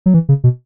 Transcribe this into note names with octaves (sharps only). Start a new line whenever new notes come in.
F#3
E3
C#3
B2